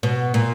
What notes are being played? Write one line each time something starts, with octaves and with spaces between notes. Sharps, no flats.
B2
A#2